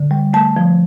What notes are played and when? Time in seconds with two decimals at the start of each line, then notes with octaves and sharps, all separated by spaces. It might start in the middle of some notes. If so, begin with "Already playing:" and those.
Already playing: D3
0.11 G3
0.33 A3 A5
0.56 F3